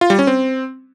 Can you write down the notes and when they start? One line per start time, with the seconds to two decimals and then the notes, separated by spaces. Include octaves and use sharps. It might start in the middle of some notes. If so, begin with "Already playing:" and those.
0.01 F4
0.10 G3
0.19 C#4
0.27 C4